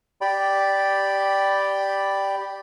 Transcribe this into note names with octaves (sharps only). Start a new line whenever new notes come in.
G4 D5 G5 B5